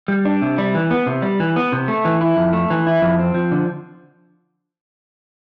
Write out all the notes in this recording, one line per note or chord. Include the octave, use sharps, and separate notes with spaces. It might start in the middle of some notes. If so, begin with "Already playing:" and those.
G3
D4
C3
G3
E3
B3
C3
G3
E3
B3
C3
A3
E3
E4
F2
A3
E3
E4
F2
C4
F3
D3